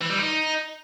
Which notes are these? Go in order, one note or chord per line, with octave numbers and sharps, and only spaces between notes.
E3
G3
D#4